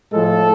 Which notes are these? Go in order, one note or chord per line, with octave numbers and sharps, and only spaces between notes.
A2 F3 G#3 A4